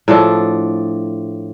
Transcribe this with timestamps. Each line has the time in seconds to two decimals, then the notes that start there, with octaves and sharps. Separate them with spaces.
0.08 A2 F3 D4 A4